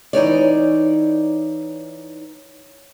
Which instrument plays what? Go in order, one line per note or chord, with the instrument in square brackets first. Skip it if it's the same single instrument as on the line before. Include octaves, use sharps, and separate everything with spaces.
[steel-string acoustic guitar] E3 D#4 C#5 D5